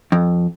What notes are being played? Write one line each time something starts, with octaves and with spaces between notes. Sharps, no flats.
F2